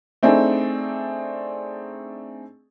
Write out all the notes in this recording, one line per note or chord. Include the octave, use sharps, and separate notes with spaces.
A3 C4 D4 D#4 G#4